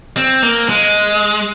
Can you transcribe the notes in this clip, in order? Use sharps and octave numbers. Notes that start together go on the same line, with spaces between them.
C4
A#3
G#3